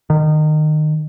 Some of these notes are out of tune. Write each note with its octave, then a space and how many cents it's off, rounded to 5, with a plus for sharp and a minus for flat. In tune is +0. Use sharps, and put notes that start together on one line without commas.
D#3 -25